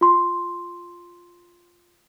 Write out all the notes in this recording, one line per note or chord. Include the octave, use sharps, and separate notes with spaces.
F4 C6